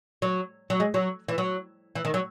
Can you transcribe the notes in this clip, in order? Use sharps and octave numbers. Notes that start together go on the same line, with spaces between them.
F#3
F#3
G#3
F#3
E3
F#3
E3
D#3
F#3